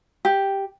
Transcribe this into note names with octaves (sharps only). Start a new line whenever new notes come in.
G4